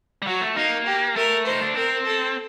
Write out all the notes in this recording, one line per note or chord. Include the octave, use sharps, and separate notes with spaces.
G3
F#3 F#4
A3
A#3 D#4
G4
A3 A#4
D#4 C5
D4
C4 A#4
A4